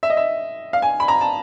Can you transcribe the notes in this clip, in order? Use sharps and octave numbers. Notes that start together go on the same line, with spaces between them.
E5
D#5
E5
F5
G#5
B5
A#5
A5